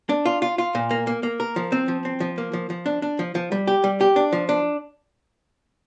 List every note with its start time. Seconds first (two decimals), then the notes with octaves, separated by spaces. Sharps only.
0.09 D4
0.26 F4
0.42 F4
0.58 F4
0.75 A#2
0.91 A#3
1.07 A#3
1.23 A#3
1.40 A#4
1.56 F3
1.72 C4
1.88 F3
2.05 C4
2.20 F3
2.38 A#3
2.53 F3
2.70 F3
2.86 D4
3.02 D4
3.19 F3
3.35 F3
3.52 G3
3.67 G4
3.84 G3
4.01 G4
4.16 D4
4.33 F3
4.49 D4